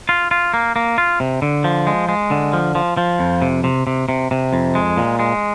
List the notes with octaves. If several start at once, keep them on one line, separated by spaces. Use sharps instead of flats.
F4
F4
A#3
A#3
F4
C3
D3
F3
G#3
G#3
D3
F3
F3
F3
F2
C3
C3
C3
C3
C3
F2
G#3
A#2
G#3